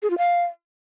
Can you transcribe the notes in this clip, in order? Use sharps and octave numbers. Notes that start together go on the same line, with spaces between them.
G#4
F4
F5